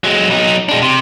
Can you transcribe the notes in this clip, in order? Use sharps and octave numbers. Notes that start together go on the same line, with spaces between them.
F#3 G#3
F#3 D#4
G#3 D4
C3